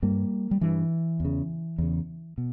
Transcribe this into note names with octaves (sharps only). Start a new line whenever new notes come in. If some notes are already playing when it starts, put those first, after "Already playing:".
G2 G3 A#3
G3
G2 E3
E2 C#3
E2 C#3
B2